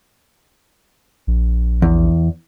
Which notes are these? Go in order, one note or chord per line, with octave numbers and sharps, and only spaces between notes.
A#1
E2